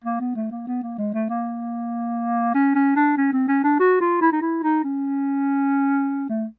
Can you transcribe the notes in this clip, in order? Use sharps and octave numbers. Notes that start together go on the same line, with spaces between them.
A#3
B3
A3
A#3
B3
A#3
G#3
A3
A#3
C#4
C#4
D4
C#4
C4
C#4
D4
F#4
F4
E4
D#4
E4
D#4
C#4
A3